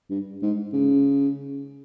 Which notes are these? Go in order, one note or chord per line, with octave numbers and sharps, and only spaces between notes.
G2
G#2
C#3